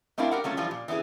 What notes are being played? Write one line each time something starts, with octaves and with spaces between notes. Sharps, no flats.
A3 C4 D4 E4 A#4 F5
G4 A#4 F#5
F#3 A3 C#4 F4
E3 F3 G3 F4
A#2
E3 B3 D#4 E4 G#4